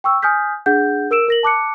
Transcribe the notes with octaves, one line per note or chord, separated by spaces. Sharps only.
G5 C#6 E6
G#5 D#6 F6 G6 B6
D4 G#4 F#5 G6
A#4 E6 D7 E7
A#4 A#6 F#7
A5 D6 F#6 C#7